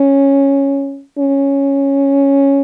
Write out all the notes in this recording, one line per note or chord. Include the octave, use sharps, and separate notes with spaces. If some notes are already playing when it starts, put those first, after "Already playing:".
Already playing: C#4
C#4